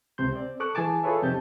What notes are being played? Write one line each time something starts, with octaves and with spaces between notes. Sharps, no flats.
C#2 C3 C6 G6
C4 D5
A4 C#6 D6 F#6
E3 G#4 G#5 A5 D6
F4 G#4 A4 B4 C#5 E5
F2 C3 D#4 G4 A5 G6